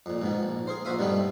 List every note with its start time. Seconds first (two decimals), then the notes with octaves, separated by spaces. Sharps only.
0.06 F2 A#2
0.22 G#2 B2 D#3
0.43 A#1
0.67 G#4 A#4 C5
0.85 A#1 F#4 C5 E5 F5 D#6
0.99 G2 B2 D#3 G3 A3 B3